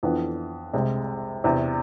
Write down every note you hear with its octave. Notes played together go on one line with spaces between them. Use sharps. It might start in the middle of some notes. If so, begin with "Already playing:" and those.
F2 E3 B3 D4
C2 C3 G#3
E2 C3 E3